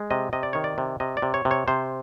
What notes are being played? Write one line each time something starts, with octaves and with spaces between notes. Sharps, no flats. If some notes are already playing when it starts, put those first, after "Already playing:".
Already playing: G#3
C3 D#5
C3 D#5
D5
D#3 C#5
D5
C3
C3 D#5
D5
C3
C#5
C3
C#5
C3 C5